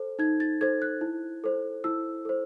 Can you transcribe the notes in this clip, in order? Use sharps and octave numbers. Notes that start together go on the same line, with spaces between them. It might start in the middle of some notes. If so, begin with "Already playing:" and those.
Already playing: A4 C5
D#4 G#6
A6
A4 C5 G#6
F#6
E4
A4 C5
E4 E6
A4 C5